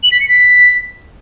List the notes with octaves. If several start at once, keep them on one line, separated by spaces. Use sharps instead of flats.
F#7
B6
C#7
B6